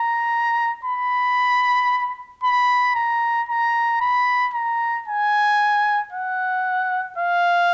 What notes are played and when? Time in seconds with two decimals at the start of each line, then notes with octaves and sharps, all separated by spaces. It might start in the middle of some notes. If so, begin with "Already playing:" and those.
Already playing: A#5
0.84 B5
2.43 B5
2.96 A#5
3.49 A#5
4.01 B5
4.54 A#5
5.08 G#5
6.12 F#5
7.18 F5